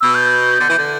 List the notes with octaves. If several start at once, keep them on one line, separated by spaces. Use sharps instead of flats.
B2 E6
G6
D3
E3
D3